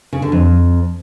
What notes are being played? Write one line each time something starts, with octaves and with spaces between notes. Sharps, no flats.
C#3
D3
F2